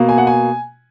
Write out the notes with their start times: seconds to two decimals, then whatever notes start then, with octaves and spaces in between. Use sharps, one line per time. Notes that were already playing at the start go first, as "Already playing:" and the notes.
Already playing: B2 A#3
0.09 G#5
0.18 F#5
0.27 G#5